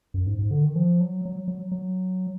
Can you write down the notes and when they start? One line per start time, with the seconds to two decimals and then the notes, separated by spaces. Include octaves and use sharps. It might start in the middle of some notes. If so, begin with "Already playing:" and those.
0.14 F#2
0.26 G#2
0.39 G#2
0.51 D3
0.64 D#3
0.76 F3
1.01 F#3
1.25 F#3
1.48 F#3
1.72 F#3